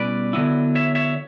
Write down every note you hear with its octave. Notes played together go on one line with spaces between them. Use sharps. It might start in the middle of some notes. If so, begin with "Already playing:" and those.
Already playing: B2 G3 C#4 E4 B4 D5
D3 F#3 B3 E4
C#5 E5
C#5 E5